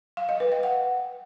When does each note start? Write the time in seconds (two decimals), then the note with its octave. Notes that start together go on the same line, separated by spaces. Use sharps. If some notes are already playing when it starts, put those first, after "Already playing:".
0.17 F5
0.29 D#5
0.40 B4
0.52 G5
0.63 F#5